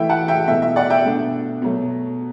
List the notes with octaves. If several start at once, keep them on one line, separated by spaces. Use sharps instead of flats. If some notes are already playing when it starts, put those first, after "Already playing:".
Already playing: E3 A3 E4 E5 G5
F#5 A5
E5 G5
B2 A3 E4 E5
E5
D5 F#5
E5 G5
B2 A3 D4
B2 F#3 A3